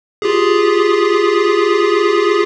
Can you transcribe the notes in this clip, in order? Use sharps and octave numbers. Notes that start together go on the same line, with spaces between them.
F4 G4 G#4